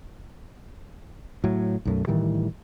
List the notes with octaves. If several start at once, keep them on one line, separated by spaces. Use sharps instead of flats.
A2 F#3
B1 F#2 A3
A2 D#3 E3 G3